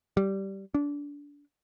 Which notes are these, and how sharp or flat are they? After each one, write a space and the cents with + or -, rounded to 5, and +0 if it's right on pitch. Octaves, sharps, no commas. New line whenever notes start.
G3 -10
D4 -25